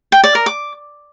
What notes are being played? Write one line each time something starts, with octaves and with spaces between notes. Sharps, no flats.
G5
D5
A#4
D6